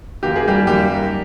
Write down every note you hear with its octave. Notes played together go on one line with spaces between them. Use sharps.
F#2 D#3 F#3 A#3 G4
G#4
G3 G4
F#2 D#3 F#3 G3 A#3 G4